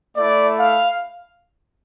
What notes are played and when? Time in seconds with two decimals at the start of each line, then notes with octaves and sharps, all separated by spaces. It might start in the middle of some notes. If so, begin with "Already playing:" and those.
0.15 A3 E4 D5
0.60 F5